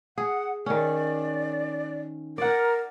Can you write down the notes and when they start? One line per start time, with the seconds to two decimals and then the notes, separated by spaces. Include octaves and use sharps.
0.18 G#4 F#5
0.66 D#3 C#4 D5
2.38 A#4 D5 F#5